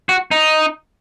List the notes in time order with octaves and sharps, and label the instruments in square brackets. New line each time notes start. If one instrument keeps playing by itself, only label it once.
[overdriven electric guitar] F#4
D#4